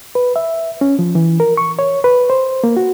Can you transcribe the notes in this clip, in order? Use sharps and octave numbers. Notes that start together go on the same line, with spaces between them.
B4
E5
C#4
F3
E3
A#4
C#6
C#5
B4
C5
A#3
F#4